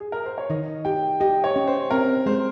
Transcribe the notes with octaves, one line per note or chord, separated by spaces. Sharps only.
G#4
A#4
C5
C#5
D#3 D#5
G4 G5
G4 D#5
C#5
C#4
C5
C4 A#4
G#3 C5